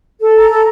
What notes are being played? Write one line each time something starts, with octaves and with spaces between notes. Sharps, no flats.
A4
A#5
A4